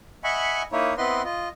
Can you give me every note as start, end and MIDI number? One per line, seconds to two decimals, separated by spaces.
0.24 0.63 75
0.24 0.63 76
0.24 0.63 78
0.24 0.63 80
0.24 0.63 83
0.24 0.63 85
0.72 0.94 58
0.72 0.94 63
0.72 0.94 64
0.72 0.94 73
0.98 1.22 59
0.98 1.22 60
0.98 1.22 64
0.98 1.22 71
0.98 1.22 75
0.98 1.22 84
1.24 1.49 65
1.24 1.49 75